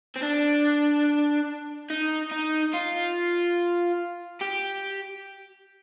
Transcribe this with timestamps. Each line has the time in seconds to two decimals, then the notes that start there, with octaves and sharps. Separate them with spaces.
0.16 C4
0.23 D4
1.90 D#4
2.31 D#4
2.74 F4
4.41 G4